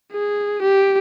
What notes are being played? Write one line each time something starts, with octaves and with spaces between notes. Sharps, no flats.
G#4
G4